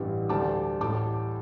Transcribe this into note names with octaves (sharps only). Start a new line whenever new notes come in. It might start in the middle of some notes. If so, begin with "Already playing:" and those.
Already playing: A1 G2 E3 G3
D2 D3 G3 A5 D6
A1 A2 G3 A5 D6